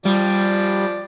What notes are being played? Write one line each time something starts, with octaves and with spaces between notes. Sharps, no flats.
F3 G3 D5